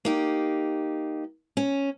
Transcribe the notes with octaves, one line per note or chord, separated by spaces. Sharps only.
A#3 D#4 G4
C#4